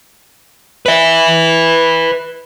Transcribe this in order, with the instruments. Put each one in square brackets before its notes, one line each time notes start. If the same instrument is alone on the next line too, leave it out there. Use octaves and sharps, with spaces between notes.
[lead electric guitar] B4 E5